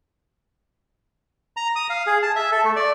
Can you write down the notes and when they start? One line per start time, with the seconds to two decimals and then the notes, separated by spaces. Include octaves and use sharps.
1.57 A#5
1.76 D#6
1.90 F5
2.07 G#4
2.22 A5
2.36 E5
2.52 A4
2.64 A3
2.76 D5